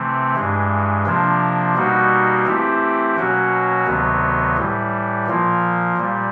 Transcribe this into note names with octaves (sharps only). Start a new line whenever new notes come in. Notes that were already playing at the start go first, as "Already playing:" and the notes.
Already playing: C3 E3 A3 C4
G2 E3 G#3
C3 F3 A#3 D4
B2 G3 A#3 D#4 F#4
E3 A3 C4 E4 G4
B2 F#3 A#3 C#4 F#4
D2 C3 D#3 F#3 B3
A2 E3 G3
A#2 F3 A#3
A#2 G3